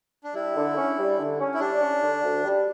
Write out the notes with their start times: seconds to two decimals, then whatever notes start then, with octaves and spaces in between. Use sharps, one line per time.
0.24 D4
0.34 G3 E4
0.55 D3
0.76 C#4
0.97 G3
1.19 D3
1.40 C#4
1.54 E4
1.60 G3 D4
1.81 C#4
2.02 D3
2.23 D2
2.44 G3